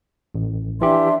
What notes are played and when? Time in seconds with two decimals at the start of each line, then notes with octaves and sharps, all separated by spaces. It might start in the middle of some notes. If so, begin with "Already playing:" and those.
0.35 A1
0.82 E3 D4 G4 E5 C6